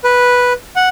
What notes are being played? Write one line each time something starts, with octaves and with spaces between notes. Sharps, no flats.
B4
F#5